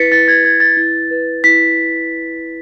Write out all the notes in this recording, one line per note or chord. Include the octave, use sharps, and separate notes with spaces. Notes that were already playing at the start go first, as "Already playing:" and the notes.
Already playing: E4 B4 A6 B6 C#7
E4 A6
G#6
B4 G#6
A6
E4
B4
E4 B6